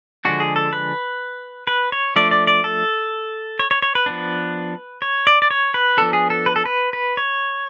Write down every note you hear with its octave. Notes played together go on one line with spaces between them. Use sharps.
D3 F3 G#3 D4 F#4
G#4
A4
B4
B4
C#5
F3 A3 D4 D5
D5
D5
A4
C#5
C#5
C#5
B4
F3 B3 D4
C#5
D5
D5
C#5
B4
F3 B3 D4 A4
G#4
A4
B4
A4
B4
B4
C#5